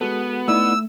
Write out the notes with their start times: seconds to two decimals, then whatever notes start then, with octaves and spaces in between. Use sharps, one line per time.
0.01 G#3 B3 F#4 A4
0.48 A3 D#4 E4 D5 E6